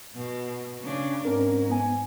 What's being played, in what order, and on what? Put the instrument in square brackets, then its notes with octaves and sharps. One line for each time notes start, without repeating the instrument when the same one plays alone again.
[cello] B2
C#3 D4
[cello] G#2 [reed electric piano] C4 C#4 A#4
[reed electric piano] B3 G#5